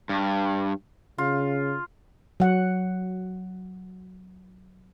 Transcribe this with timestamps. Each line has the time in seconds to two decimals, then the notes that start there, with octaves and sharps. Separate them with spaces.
0.09 G2
1.18 C#3 F4
2.40 F#3 F#5